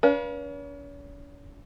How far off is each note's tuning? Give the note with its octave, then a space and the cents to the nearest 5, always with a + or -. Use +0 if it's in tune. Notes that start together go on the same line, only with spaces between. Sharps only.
C#4 +40 B4 -40 F5 +0